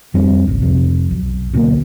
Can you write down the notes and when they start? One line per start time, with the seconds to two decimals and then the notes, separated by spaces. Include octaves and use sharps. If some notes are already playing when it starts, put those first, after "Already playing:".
0.14 F2 G3 C4 D4
0.47 G#1 C#2
0.62 F2 C3
1.10 B1
1.53 D2 B2 F#3 A#3